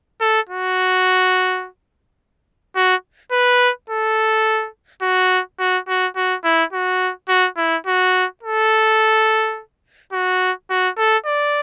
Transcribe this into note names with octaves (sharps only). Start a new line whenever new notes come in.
A4
F#4
F#4
B4
A4
F#4
F#4
F#4
F#4
E4
F#4
F#4
E4
F#4
A4
F#4
F#4
A4
D5